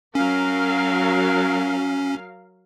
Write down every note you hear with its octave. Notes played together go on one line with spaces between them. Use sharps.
F#3 C#4 A#4 F5